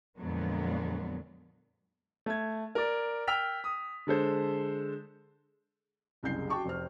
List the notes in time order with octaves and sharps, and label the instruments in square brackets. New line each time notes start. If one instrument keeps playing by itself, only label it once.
[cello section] F2 A#2 D3 F#3 G#3 B3
[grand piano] A3 G#6
A#4 D5
G5 E6 F6 B6 F7
D#6
D3 G#3 A4 C5
[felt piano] F#1 C2 G4 G#4 G6 C7
F#4 G5 A5 C#6 D6
F1 C4 F6